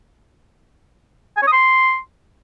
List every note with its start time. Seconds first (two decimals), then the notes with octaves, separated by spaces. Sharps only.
1.37 G#5
1.42 C#5
1.47 D#6
1.53 C6